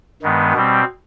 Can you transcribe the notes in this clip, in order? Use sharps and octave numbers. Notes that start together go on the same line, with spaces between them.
G2 D#3 G#3 B3
B2 G3 C4